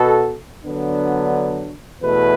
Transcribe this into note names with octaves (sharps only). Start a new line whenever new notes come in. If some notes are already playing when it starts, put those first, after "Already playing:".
Already playing: B2 B3 F#4 A4
D3 F#3 B3 D4
E2 B2 A3 E4 B4